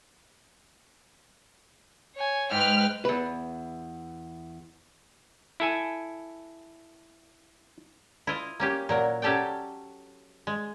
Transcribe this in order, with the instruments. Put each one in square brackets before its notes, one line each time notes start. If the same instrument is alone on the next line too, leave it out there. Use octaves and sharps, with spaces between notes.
[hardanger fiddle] C#5 G#5
[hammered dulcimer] G#2 [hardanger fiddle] B4 G5 [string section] F6
[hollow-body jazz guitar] E2 B4
[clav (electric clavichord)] E4 A4 G#5
[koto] E4 F4 D#5
A#3 C#4 G4
A#2 F#3 A#4
F#3 C#4 G4 A4 D5 G5
G#3